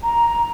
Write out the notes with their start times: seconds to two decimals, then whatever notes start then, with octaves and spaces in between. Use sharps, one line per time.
0.03 A#5